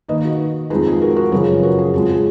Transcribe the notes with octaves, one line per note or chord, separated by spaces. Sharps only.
D#3 A#3 D#4 B4 D#5
F#4
F2 F3 G#3 D#4 G#4 B4
G#4
F#4 A#4
F#4 A#4
F#2 C#3 F3 G#4 B4
F#4 A#4
G#4
F2 F3 G#3 F#4
G#4